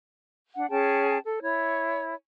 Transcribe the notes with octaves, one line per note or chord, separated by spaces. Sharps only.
D4 F#5
C#4 G#4 G5 A5
A4
E4 C#5